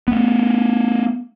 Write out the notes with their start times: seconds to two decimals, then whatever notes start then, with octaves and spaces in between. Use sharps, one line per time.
0.08 A3 B3